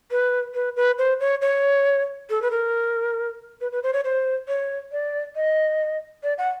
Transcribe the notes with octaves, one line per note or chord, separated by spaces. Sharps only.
B4
B4
B4
C5
C#5
C#5
A4
B4
A#4
B4
B4
C5
C#5
C5
C#5
D5
D#5
D5
F#5